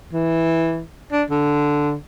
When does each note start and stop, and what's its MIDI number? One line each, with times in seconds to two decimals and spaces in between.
0.13 0.83 52
1.12 1.23 62
1.30 1.95 50